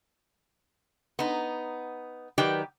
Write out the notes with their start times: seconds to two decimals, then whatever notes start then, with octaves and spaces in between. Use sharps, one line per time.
1.19 B3 D#4
2.38 D#3 F#3 G4 B4 D5 G5